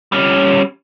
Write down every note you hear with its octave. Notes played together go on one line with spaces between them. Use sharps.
G3 C#4